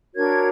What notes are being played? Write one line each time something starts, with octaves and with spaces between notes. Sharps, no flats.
D4 F#4 A#4 C#5 G#6